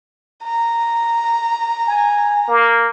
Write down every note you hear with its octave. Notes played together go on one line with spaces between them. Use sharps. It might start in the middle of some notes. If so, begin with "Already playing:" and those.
A#5
G#5
A#3